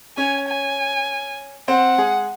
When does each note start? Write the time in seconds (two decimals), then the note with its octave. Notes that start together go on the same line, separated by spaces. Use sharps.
0.17 C#4 C#5 G#5
0.47 G#5
1.68 C4 C5 F#5
1.98 G#3 G#4